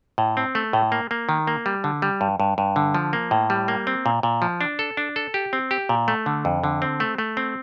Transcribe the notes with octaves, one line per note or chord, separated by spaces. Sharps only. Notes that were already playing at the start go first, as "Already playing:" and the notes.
A2
C4
A3
A2
A#3
A#3
D#3
A#3
G3
D3
G3
G2
G2
G2
D3
F3
A#3
A2
G3
A#3
C4
A#2
A#2
F3
D4
A4
D4
A4
G4
C4
G4
A#2
A3
D3
F2
D3
C4
A3
A3
C4